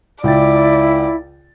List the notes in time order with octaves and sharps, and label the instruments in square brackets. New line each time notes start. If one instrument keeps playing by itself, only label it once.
[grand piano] C#2 G5 A6 [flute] E4 [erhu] D5